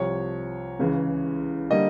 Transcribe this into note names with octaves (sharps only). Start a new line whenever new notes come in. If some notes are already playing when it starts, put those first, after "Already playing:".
Already playing: C2 C3 F3 C#5
C#2 C#3 E3
D3 G3 A#3 D#5